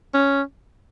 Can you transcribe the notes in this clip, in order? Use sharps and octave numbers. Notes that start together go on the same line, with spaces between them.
C#4